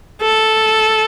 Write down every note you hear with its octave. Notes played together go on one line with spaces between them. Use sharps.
A4